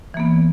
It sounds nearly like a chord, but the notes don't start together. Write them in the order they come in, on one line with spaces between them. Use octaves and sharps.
E3 A#3 B3